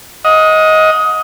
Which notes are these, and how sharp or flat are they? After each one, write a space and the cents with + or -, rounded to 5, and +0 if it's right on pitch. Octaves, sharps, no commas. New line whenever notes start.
D#5 +15 F#5 -35